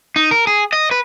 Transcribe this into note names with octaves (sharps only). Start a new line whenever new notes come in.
D#4
A#4
G#4
D#5
B4